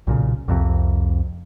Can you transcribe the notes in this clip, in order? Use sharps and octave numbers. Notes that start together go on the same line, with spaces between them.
B1 A#2 C#3
C2 F2 C3